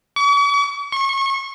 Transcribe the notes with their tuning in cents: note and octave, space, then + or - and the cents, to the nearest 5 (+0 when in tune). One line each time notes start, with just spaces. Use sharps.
C#6 +45
C#6 -30